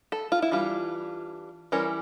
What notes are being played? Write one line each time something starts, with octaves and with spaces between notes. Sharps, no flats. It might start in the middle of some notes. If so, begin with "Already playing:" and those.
A4
F4
E4
E3 G3 D4 F4
E3 G3 C#4 A#4